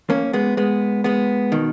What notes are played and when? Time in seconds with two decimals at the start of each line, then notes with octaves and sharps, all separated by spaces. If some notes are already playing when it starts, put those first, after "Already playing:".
0.10 A#3 C#4
0.33 G#3 B3
0.57 G#3 B3
1.04 G#3 B3
1.52 B2 D#3